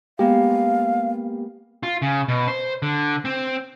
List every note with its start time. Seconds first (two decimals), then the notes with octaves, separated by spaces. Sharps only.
0.19 G#3 A#3 B3 G4 F5
1.83 F4
2.02 C#3
2.28 B2
2.48 C5
2.82 D3
3.25 C4